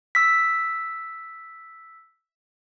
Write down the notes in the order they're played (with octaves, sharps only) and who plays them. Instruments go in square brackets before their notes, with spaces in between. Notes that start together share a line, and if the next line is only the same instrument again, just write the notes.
[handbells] E6 B6